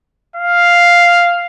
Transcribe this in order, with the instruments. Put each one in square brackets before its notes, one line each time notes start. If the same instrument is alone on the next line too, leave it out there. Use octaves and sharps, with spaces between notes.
[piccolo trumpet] F5